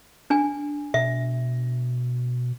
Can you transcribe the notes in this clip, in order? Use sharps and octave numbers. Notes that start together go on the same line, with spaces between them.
D4 G#5
B2 E5